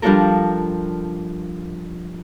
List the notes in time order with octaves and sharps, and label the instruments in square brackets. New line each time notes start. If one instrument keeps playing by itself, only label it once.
[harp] F3 G3 D4 F4 A4 A#4